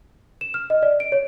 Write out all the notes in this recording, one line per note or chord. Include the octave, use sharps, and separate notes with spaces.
E7
F6
D#5
D5
D7
C#5